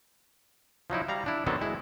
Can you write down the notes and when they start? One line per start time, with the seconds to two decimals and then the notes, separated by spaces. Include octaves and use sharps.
0.90 F3 F#3 D#4 E4
1.08 G3 F5 A#5
1.26 D4 E4
1.46 D3 D#3 F#3 B3 C4 A4
1.61 G#3 E4